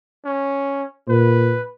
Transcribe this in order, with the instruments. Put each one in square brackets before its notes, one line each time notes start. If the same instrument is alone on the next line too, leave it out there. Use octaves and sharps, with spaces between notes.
[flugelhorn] C#4
[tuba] A#2 [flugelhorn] B4